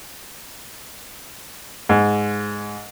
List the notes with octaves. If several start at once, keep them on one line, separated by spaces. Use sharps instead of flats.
G#2